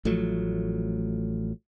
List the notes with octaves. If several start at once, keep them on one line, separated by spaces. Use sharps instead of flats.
A1 F3 F#3 A3